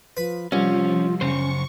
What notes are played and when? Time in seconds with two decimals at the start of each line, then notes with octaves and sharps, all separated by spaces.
0.17 F3 B4
0.52 C2 F3 C#4 F4
1.21 F#2 C#3 C#4 C5 C#6